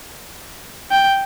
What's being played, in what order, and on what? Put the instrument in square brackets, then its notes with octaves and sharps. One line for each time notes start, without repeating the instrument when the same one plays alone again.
[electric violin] G5